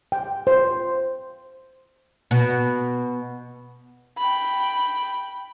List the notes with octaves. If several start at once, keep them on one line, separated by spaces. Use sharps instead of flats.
G5
C5
B2
G5 B5